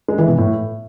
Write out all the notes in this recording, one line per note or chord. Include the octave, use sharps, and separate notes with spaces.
G#3
E3
B2
A2